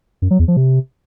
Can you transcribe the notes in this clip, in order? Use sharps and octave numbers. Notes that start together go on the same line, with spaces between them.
F#2
F#3
E2
F3
C3